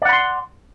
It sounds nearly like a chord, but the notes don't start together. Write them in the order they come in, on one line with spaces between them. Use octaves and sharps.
D5 F#5 B5 C6